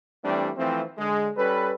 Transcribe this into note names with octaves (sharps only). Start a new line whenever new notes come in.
E3 G3 A3 C4 D4
E3 F3 A3 C4
D3 G#3
G3 C#4 A4 B4